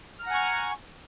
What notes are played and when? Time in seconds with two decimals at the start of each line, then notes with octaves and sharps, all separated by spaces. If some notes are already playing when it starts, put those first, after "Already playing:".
0.19 F6
0.23 A#5
0.27 F#5
0.30 G#5
0.34 C#6